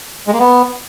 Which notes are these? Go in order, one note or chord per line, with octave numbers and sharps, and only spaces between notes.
G#3
A#3
B3